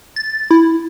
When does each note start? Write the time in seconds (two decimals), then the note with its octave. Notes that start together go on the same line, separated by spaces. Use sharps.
0.16 A6
0.51 E4